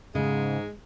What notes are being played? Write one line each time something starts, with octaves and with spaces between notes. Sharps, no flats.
G#2 C#3 G#3